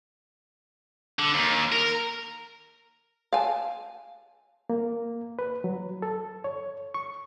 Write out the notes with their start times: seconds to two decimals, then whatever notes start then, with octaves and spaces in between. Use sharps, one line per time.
1.19 D3
1.34 D#2
1.72 A#4
3.33 F5 G#5 A5
4.70 A#3
5.39 B4
5.64 F#3
6.02 A4
6.44 C#5
6.94 C#6